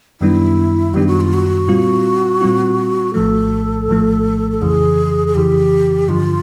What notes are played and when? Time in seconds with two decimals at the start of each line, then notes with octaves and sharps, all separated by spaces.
0.21 F#2 D#3 G3 B3 D4 E4
0.94 F#2 D#3 G3 B3 D4 G4
1.07 F#4
1.20 F4
1.33 F#4
1.67 A#2 G3 C4 F4
2.41 A#2 G3 C4 F4
3.14 A#1 A2 F3 A3 A4
3.88 A#1 A2 F3 A3
4.51 A4
4.61 F2 C#3 E3 G#4
5.27 G#4
5.35 F2 C#3 E3 G4
6.08 G2 D3 F3 F4